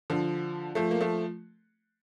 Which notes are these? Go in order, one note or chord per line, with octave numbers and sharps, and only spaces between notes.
D3 F3
F3 A3
A#3
F3 A3